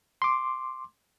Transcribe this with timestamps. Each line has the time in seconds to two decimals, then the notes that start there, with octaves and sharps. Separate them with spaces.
0.22 C6 D6